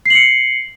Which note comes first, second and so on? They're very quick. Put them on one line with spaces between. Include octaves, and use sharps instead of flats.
C7 F#7 C#7